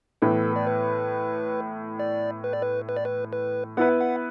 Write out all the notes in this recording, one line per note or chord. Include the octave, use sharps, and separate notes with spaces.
A2 E3 B3 A4
D5
B4
D5
B4
D5
B4
B4
D5
B4
B4
B3 E4 B4 F#5
F#5